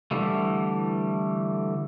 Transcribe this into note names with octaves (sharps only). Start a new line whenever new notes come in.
D3 E3 G3 A3